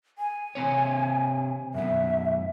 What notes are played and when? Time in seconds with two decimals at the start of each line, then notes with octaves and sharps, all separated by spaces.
0.18 G#5
0.55 C3 C4 C#5
1.74 F#2 B2 E5